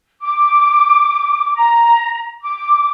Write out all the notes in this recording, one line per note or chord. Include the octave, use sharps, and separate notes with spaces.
D6
A#5
D6